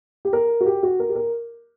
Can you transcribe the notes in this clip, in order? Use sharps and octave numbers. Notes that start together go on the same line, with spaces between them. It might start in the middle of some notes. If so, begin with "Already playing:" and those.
G4
A#4
F#4
G4
F#4
A#4
G4
A#4